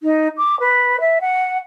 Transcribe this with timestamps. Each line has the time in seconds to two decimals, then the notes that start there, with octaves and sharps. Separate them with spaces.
0.03 D#4
0.37 D6
0.59 B4
1.00 E5
1.21 F#5